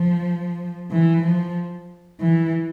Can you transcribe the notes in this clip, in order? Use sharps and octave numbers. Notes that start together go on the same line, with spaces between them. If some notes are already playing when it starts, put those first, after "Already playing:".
Already playing: F3
E3
F3
E3